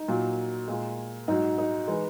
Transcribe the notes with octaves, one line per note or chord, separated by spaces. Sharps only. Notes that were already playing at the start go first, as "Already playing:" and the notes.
Already playing: D#4
A#2 F#3
A#2 G#3
G#2 F#3 D#4
D#4
E3 G#3